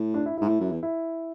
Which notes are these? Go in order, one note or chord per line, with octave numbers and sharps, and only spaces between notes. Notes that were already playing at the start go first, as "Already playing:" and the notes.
Already playing: A2
D4
E4
G#2 E4
A2
F#2
E2
E4